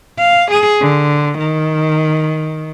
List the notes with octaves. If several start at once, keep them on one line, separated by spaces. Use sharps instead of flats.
F5
G#4
D3
D#3